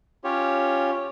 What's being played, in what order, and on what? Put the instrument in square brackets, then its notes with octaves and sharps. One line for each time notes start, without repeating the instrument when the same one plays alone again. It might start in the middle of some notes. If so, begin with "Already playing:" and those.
[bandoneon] C#4 F4 G4 C#5